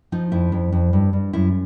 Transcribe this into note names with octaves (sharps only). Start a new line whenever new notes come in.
F3 D#4
F2 E4
F2
F2
G2
G2
F#2 E4